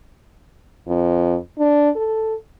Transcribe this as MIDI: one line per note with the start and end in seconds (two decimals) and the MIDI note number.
0.88 1.36 41
1.59 1.90 62
1.95 2.34 69